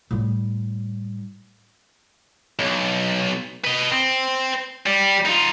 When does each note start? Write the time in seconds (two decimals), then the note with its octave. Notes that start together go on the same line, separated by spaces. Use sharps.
0.11 A2 G3
2.59 B1
3.65 B4 D#5
3.92 C4
4.86 G3
5.25 D#4 F4